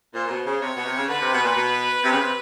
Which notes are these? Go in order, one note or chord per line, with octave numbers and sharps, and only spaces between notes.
A#2 C5
A#2
B2
C#3
C3 C#5
B2
C3
C#3
D3 B4
C3
B2
A#2
B2
C3
C#3
C3